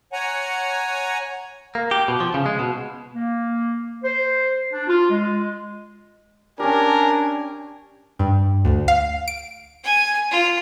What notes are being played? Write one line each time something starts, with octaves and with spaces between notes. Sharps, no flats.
C#5 F#5 G#5 A#5
A#3
G4
B2
F3
C#3
G#3
B2
A#3
C5
D4
F4
G#3
C#4 D4 G4 A#4 G#5
G2
D2
F5
D7
G#5
F4